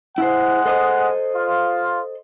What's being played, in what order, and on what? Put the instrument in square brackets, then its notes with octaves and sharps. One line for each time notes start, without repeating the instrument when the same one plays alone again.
[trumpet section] G#3 F#5 [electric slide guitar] E4 C5
[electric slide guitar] A4 C5 D#5
[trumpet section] F4